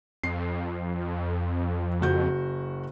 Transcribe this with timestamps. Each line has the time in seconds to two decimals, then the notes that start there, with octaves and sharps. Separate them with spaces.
0.23 F2 C7
2.01 F#1 F#4 G6